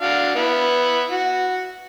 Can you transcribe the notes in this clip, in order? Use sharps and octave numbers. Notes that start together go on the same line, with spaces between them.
D4 F#4 F5
B3 E4
F#4